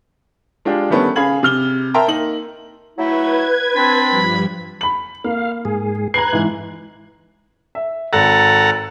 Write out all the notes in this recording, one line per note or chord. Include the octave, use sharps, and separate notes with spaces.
G#3 D4 F4 G4
D3 D#3 G3 A3 B3 C#4
C#3 G#4 F5 B5 G#6 F#7
C3 F6 G7
A#4 E5 G5 A5 A#5 C6
A#3 D#4 F#7
F#3 A3 E4 B4 G#6
C4 D4 B5
G2 F3 G3
B5 F#7
A#3 F5
G#2 G#4
B4 A#5 F#6 G#6 C7
G#2 E3
E5
G#1 A4 F#5 A#5 A6